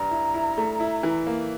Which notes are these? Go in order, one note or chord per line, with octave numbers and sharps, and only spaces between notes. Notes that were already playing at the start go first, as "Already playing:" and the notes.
Already playing: G2 A#5
E4
E4
A3
E4
E3
A#3